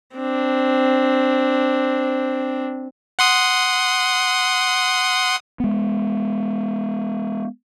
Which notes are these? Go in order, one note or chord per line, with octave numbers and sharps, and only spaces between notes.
C4 D4
F#5 C6 D#6
G#3 B3